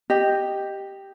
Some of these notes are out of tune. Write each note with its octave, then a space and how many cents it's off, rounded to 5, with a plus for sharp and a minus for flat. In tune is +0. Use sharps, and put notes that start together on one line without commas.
G4 +0 D#5 -10